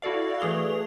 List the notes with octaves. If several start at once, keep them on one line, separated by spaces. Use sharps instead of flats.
E4 F#4 A4 D5 F5
E3 A3 G#4 F7 G7